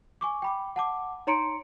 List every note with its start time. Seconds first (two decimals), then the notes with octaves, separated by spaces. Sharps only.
0.21 G#5 C#6 D6
0.42 G5 B5 D6
0.76 F#5 A5 D6
1.27 D#4 C#5 A#5 C6 C#7 D7